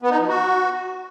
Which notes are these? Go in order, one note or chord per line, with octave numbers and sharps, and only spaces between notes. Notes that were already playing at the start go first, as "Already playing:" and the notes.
B3
D#4
F3
F#4